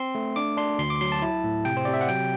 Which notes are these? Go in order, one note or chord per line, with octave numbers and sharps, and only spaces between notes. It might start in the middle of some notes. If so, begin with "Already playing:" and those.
Already playing: C4 C6
A3
D4 D6
D4 C6
D2 C6
D6
F#3 C6
A5
E4
A2
C3 G5
C5
C3 D5
E5
F#5
F#3 G5